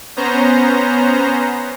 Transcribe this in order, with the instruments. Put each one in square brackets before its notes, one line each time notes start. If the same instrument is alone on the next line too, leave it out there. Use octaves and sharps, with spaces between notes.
[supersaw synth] B3 C#4 C5 A#5